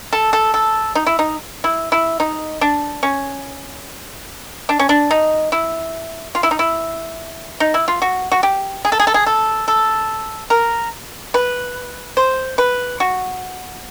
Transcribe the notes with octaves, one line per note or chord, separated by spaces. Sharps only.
A4
A4
A4
D#4
E4
D#4
E4
E4
D#4
D4
C#4
D4
C#4
D4
D#4
E4
F4
E4
D#4
E4
D#4
E4
F4
F#4
F#4
G4
G#4
A4
G#4
A4
G#4
A4
A4
A#4
B4
C5
B4
F#4